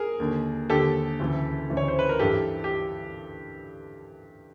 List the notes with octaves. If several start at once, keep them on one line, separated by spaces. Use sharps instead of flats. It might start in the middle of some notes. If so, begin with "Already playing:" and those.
Already playing: G#4 A#4
D#2 D3
D#2 D3 G4 A4
D2 C#3 E3
D2 C#3 E3
C#5
C5
B4
A#4
G2 E3 G4 A4
G4